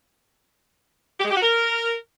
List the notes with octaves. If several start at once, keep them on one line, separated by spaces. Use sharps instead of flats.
G4
G#3
G4
F#4
A#4